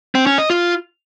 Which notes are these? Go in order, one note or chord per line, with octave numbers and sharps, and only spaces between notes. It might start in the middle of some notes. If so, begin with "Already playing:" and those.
C4
C#4
D#5
F4